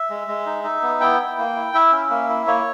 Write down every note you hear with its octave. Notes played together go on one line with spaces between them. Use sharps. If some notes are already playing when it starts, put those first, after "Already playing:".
Already playing: E5
G#3
G#3
D#4
D#4
B3
E4 G5
E4
A#3
E4
E4 E5
C#4
A#3
E4
A#3 C#5